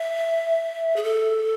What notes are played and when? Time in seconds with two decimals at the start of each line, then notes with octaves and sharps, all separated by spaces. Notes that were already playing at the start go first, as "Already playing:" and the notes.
Already playing: E5
0.96 G#4
1.03 A4